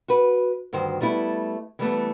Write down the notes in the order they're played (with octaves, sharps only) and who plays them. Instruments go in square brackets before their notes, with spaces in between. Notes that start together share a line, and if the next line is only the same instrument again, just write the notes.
[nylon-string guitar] F#4 B4
D2 G2 D#3 C5
G3 A3 B3 E4
E3 G3 A3 B3